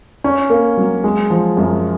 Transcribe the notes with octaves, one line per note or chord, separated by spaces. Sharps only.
C#4
A#3
F#3
G#3
F3
F#2